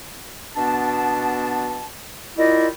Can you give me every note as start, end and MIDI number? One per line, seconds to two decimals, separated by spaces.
0.56 1.85 47
0.56 1.85 59
0.56 1.85 62
0.56 1.85 81
2.38 2.67 46
2.38 2.67 64
2.38 2.67 65
2.38 2.67 67
2.38 2.67 75